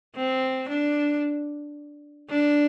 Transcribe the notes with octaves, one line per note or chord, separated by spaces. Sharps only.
C4
D4
D4